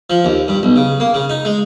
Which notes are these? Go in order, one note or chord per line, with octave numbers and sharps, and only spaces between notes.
F3
D#2
G2
B1
C#3
A#3
C#3
D#4
G#3